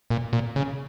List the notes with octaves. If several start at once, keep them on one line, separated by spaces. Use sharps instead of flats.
A#2
A#2
C#3